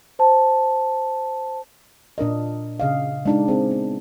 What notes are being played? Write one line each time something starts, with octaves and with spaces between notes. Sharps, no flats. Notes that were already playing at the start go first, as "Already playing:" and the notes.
C5 A5
A#2 D4 A#4 D#5
C#3 D#5 F5
G#3 D4 D#4
C4 G#4 A#4
B3